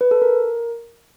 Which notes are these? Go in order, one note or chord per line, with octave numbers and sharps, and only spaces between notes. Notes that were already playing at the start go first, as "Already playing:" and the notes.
B4
A4
A#4